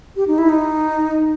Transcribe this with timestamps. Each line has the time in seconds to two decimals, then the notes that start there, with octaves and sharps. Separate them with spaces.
0.16 G4
0.27 D#4
0.38 E4
0.49 D#4